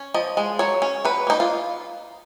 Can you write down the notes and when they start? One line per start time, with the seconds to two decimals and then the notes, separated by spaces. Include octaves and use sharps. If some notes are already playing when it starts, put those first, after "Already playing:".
Already playing: C#4
0.14 F3 D#5
0.37 G#3
0.59 F#3 C#5
0.82 C#4
1.05 F#3 B4
1.27 A#3 D#4
1.40 F4